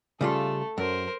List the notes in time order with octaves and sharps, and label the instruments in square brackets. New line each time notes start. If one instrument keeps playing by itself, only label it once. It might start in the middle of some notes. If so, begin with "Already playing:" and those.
[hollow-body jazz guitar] C#3 G3 F4 [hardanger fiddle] A3 A4
[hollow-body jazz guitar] F#2 [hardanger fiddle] A#4 C5